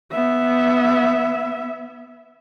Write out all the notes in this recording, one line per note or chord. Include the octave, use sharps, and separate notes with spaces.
B3 E5